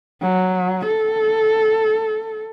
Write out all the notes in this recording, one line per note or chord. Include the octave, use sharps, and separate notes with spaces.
F#3
A4